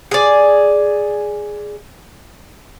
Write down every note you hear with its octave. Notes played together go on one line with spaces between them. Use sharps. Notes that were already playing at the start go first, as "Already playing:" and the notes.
G#4 D5